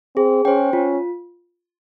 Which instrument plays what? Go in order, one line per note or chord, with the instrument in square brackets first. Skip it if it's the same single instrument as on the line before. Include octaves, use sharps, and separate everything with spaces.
[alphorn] C4 [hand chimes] G#4
[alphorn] C#4 [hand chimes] C5 G5
[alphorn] C#4 [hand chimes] F4